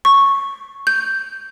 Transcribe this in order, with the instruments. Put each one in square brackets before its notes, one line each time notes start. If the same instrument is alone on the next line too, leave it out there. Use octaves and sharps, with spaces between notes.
[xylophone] C#6
G6